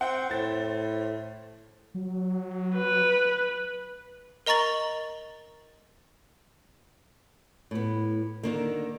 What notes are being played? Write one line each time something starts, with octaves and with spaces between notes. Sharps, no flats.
C4 F#5 G5
A2 C5 A6
F#3
B4
A#4 D#5 A#5 C#6 A6 F#7
A2 B3
D3 D#3 A#3